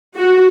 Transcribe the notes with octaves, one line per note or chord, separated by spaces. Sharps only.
F#4